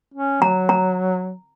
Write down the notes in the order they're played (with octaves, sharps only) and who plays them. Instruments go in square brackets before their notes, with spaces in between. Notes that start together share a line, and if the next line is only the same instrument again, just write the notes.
[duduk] C#4
[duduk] F#3 [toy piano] A#5
[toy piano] A#5